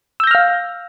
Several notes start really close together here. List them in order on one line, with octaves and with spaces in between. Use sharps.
E6 G6 A#6 F6 F5